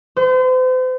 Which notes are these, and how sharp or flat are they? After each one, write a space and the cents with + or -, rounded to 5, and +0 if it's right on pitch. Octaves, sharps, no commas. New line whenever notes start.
C5 -40